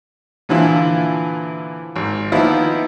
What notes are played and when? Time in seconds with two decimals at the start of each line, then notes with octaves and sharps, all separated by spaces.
0.49 A#2 D3 E3 F3 E4 F4
1.96 G#1
2.32 D#3 F3 A#3 B3 D#4 E4